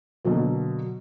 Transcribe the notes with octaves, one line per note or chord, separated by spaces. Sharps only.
B2 D3 F#3 A#3